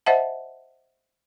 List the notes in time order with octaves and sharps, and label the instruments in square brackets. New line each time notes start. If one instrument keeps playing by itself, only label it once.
[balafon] C5 D#5 E5 F#5 A5